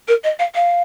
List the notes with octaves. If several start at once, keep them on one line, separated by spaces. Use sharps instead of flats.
A#4
D#5
F5
F5